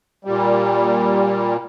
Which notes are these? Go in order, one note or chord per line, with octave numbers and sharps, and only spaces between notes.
A#2 G3